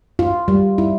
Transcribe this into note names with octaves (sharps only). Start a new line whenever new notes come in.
F4
G3
E4